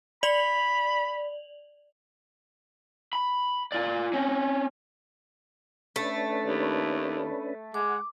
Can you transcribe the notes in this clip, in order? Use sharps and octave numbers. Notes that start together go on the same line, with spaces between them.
D5 B5 F7 F#7
B5
F4 D5
C4 C#4
A3 C#4 D4 B4
D#2
G#3 F#5 D6